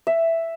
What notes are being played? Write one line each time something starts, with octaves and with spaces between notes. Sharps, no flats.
E5